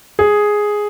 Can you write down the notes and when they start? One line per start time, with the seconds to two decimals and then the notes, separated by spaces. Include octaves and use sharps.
0.19 G#4